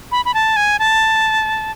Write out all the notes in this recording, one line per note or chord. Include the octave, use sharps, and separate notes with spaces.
B5
B5
A5
G#5
A5